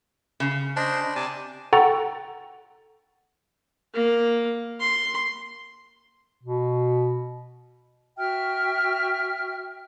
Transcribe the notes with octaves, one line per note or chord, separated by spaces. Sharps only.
C#3
D4 C5 D#5
C3 D5 G#5 A5
A4 F#5 G5 A#5 C#6 A6
A#3
C6
B2
F#4 E5 G5 F6